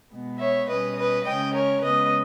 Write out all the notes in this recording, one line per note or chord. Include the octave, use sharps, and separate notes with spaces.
B2 G#3 B3
C#5 E5
B2 G3 C#4 B4 D#5
B4 D#5
C#3 G#3 C#4 D#5 G5
A#4 C#5
C#3 G#3 B3 B4 D#5